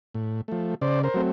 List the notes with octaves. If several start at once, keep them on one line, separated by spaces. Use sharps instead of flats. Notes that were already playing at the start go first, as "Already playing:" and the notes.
A2
F3 A3
C#3 C5 D5
A#4 C5
F#3 A3 C4